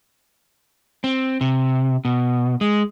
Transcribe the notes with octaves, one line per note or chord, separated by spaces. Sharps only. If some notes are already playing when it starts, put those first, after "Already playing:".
C4
C3
B2
G#3